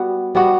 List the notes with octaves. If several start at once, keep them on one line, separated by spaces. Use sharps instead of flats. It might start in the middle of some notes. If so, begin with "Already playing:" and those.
Already playing: G3 B3 F#4
G3 B3 F#4